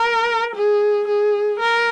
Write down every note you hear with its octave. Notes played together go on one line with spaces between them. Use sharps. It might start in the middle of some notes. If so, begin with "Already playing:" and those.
Already playing: A#4
G#4
G#4
A#4